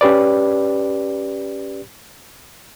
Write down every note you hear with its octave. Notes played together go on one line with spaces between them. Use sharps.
C#4 G4 B4 D5